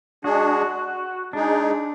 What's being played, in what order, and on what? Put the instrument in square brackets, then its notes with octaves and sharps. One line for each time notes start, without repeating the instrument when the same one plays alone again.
[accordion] G#3 D4 G#4 [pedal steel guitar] F#4
[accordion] G#3 D#4 G#4 [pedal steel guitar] D4